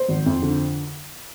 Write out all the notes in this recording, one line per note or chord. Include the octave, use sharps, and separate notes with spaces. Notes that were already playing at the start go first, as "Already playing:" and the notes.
Already playing: C5
G#1
F2
D3